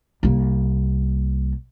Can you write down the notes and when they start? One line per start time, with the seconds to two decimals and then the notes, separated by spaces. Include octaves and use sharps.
0.23 C2 A#3